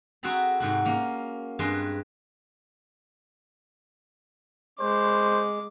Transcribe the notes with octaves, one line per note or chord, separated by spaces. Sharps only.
C4 F#4 G#4 A4 A#5 B5
G#2 C3 F#4
A#3 C#4
G2 G#3 C4 G#4 B4 C6
G#3 C5 D6